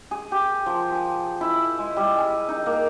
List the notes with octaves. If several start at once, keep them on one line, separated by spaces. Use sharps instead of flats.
G#4
G4
F3
G#4
E4
G#3
G3
G#4
D#4
A#3